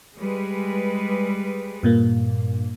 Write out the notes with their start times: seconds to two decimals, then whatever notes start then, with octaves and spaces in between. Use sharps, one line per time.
0.17 G3 G#3 B4
1.83 G2 A#2 A#3